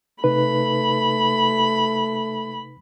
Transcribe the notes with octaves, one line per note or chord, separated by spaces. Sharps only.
C3 A3 D#4 B4 B5